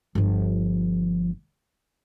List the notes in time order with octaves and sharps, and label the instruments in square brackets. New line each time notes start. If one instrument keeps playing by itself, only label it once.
[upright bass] G1 F3